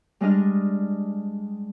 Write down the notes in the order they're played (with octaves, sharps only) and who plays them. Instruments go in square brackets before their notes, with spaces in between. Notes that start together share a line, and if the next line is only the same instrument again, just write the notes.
[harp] G3 G#3 D4 D#5 F6